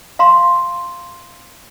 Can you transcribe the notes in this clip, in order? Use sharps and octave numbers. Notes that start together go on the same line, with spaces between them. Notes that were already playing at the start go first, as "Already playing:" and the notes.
F5 A#5 C6